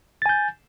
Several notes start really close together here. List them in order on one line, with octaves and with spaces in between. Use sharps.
A6 G#5 G6